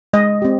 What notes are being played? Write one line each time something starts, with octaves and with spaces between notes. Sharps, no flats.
G#3 D#5
C4 G4